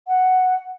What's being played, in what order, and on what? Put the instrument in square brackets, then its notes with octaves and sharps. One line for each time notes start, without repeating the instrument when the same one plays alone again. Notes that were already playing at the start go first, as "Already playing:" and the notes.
[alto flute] F#5